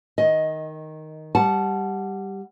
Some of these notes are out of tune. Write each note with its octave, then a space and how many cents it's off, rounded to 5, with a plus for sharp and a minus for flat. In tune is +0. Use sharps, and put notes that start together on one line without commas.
D#3 +0 D#5 +15
G3 +0 F#5 +0 A5 -15